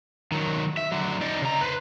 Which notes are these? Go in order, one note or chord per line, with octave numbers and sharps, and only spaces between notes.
D#3 F#3
E5
D3 F#3
D#4 D5
C#3 A#5
B4 C5